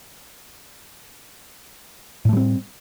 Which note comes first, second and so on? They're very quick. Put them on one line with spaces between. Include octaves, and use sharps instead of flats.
A2 A3 G3 C4